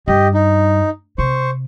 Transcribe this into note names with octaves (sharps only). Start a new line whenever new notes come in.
G2 G4 D#5
D#4
C3 C5 C#6